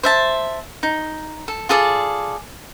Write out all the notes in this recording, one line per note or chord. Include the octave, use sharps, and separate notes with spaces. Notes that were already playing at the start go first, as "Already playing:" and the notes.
C5 E5 A5
D#4
A4
F4 G#4 A4 D5